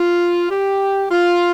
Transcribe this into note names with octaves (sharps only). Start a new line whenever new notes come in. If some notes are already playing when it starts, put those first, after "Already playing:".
Already playing: F4
G4
F4